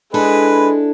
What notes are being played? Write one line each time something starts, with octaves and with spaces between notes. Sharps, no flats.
G#3 D4 E4 A4 B4